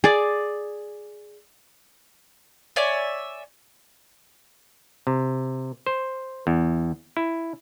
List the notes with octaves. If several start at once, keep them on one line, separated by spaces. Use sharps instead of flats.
G#4 D5
C#5 D5 E5 G#5
C3
C5
E2
E4